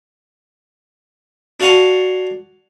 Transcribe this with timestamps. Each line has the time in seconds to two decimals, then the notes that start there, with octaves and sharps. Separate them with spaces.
1.60 D4 F#4 F5 F#5 G#5 A5